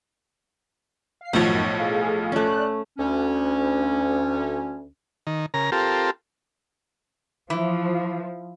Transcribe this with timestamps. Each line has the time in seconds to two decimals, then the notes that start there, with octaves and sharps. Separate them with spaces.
1.21 F5 C7
1.33 B1 F#2 A2 D#3 F3 C#5 F#5
1.79 G#4 A4 F5
2.32 A3 C#4 D5 F#6
2.98 D2 C#4
5.27 D#3
5.54 C#3 A#4 A#5
5.72 C4 F4 G4 A4 A#4
7.50 E3 F3